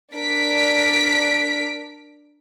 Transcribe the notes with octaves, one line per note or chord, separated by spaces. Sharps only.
D4 A#4 B6 D7